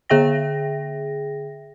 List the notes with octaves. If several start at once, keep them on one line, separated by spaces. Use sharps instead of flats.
D3 G#4 E5 G5 A#6